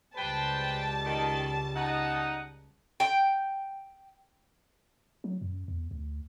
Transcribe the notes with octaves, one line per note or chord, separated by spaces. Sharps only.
C#2 G3 B4 C5 G5 A5
D#3
D#4 F#5
G5
F#3
F#2
E2
D2